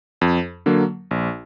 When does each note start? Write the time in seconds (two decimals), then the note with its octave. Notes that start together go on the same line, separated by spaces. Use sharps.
0.21 F2
0.66 D3 F#3 A#3
1.11 A#1